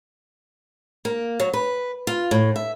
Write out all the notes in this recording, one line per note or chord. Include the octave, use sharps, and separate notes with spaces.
A#3
F#3
B4
F4
A2
E5